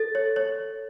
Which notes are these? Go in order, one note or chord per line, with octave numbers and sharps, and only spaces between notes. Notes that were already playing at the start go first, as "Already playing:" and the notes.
Already playing: A4 A6
C#5
C#5